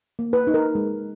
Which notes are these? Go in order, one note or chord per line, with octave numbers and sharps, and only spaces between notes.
A#3
B4
D#4
A#4
G#3